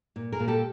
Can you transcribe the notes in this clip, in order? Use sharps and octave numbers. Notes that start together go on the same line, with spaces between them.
A#2
G#4 A#4
A#2
G4 A4